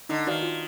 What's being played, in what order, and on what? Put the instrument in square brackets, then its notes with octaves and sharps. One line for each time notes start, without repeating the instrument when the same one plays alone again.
[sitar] D3 [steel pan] D#4
[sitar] D#3 [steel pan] F#4 B4 D5 F5
[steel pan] F4